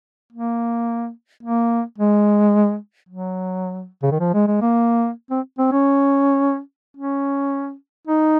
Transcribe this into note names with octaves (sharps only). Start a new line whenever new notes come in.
A#3
A#3
G#3
F#3
C#3
D#3
F3
G#3
G#3
A#3
C4
C4
C#4
C#4
D#4